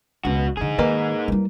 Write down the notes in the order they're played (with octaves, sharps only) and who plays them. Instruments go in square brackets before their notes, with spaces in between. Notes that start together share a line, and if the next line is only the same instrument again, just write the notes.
[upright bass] C#2 [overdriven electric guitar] B3 F#4
[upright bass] D3 F3 [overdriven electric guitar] D#4 G#4
[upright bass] D#3 [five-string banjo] A#3 B4 D#5
[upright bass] G3 E4